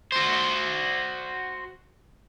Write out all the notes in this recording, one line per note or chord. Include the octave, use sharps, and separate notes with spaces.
F#4 C5